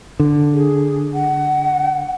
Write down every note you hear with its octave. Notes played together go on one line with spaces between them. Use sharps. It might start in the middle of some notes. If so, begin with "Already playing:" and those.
D3
G#4
F#5